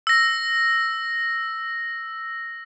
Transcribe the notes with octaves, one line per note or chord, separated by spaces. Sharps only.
E6 A#6